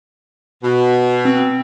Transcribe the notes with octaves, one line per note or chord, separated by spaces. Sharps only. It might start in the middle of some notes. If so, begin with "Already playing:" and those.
B2
C4